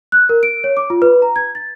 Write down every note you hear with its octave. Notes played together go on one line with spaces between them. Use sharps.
F#6
A#4
D7
C#5
D6
F4
B4
A#5
G#6
A6